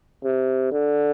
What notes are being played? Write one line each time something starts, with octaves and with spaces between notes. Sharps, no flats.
C3
D3